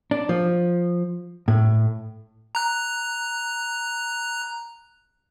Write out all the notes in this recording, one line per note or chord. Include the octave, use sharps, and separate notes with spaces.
D4
F3
A2
A#5 F#6